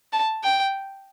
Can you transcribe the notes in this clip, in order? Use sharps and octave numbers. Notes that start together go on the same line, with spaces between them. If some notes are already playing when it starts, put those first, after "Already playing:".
A5
G5